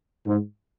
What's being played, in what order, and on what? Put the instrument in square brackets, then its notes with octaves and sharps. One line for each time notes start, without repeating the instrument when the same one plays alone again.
[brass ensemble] G#2